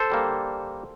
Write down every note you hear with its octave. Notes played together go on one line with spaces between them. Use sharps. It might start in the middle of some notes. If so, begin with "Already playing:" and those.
Already playing: A4 C5
D3 G3 A#3